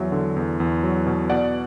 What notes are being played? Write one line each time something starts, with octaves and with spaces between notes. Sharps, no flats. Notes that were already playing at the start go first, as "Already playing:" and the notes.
Already playing: E2 F#3 E5
D3
E2
E2
F#3
B2
B2 D5 F#5